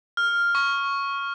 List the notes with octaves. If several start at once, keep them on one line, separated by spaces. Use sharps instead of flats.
F6
C#6